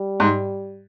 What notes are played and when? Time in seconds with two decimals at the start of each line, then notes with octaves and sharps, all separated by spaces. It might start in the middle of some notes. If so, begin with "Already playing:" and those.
Already playing: G3
0.20 G#2